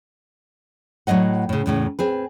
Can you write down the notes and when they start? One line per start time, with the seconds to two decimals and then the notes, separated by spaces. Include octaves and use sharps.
1.07 A2 F#3 C4 D#5 F#5
1.49 A2 C#3
1.66 E2 A2 C#3
1.99 C4 G#4 B4